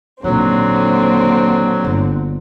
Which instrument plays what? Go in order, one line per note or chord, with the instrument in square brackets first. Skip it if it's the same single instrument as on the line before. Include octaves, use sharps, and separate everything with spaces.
[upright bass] A#1 D#4 [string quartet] D#2 D3 C4 [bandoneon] F#3
[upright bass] G1